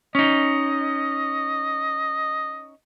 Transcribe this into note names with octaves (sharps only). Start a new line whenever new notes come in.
C#4 D#4 D#5